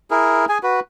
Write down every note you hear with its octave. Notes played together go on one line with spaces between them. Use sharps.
E4 G#4 A#4
G#4 G#5
F#4 B4